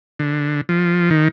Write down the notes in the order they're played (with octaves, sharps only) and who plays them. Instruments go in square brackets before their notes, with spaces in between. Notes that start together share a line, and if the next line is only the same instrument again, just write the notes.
[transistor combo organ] D3
F3
D#3